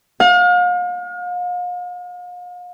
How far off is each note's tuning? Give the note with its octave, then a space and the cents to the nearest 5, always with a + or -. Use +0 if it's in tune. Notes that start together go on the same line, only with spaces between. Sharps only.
F5 +40